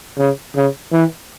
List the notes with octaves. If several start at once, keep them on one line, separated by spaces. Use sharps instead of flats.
C#3
C#3
E3